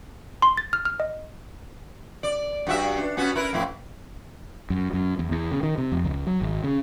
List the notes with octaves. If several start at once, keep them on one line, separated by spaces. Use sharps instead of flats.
C6
A6
F6
F6
D#5
D5
G2 F#4 E5
D4
B3 C#4 F#4
E4 A#4 B4
F2 A2 E4
F#2
F#2
E2
E2
C#3
D#3
C3
F2
C#2
F#3
G#1
C#3